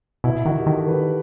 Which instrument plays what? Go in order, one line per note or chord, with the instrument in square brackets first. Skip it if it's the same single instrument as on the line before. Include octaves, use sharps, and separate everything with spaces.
[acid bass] B2 [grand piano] E4
[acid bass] D#3 [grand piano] F#4
[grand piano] G4
[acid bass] D#3 [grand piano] A4
[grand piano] B4